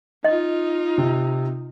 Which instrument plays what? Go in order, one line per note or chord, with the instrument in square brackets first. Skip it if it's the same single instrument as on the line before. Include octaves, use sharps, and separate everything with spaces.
[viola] D#4 F4 [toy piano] D#5
[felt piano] C3